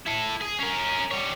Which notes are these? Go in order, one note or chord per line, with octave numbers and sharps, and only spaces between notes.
E4 A4
G#4
C#4 A#4
G3 C#5